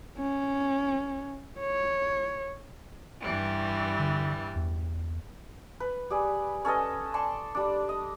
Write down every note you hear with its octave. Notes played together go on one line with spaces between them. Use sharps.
C#4
C#5
G2 E3 G3
D3
E2
B4
G3 G#4
C#4 A4 B4 D#5
D5 A5 C6 C#6
G3 D4
D#5